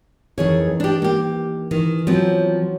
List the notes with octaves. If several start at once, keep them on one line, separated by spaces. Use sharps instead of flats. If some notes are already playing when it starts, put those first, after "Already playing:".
F2 D#3 E3 D#4 G#4 C#5
D4 G4
A#3 G4
D#3 E3
F3 F#3 B3 C4